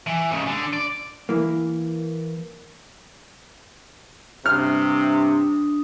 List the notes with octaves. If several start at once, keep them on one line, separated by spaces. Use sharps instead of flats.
E3
G#2 C#3
D3
D5
E3 A#3
G2 C3 D4 D#6 F6